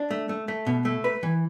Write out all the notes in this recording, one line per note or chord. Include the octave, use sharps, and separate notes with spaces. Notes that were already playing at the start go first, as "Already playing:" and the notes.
Already playing: D4
A3
A3
A3
B2
A3
B4
E3